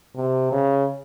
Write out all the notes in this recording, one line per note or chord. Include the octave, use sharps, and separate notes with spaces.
C3
C#3